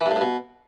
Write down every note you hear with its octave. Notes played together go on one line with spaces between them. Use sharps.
E3
G2
A2
G2
B2